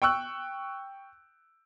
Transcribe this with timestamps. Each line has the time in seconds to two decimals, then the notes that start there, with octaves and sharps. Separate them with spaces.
0.02 G5 C#6 E6 F#6